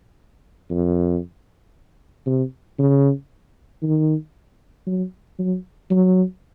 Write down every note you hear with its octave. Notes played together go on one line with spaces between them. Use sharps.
F2
C3
C#3
D#3
F#3
F#3
F#3